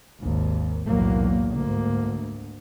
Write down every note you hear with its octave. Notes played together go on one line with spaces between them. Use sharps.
G#1 D#2
B1 E2 A2 F#3 A#3
D2 G#2 A#3